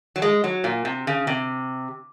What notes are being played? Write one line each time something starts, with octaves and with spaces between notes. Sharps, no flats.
F#3
G#3
F#3
A#2
C3
C#3
C3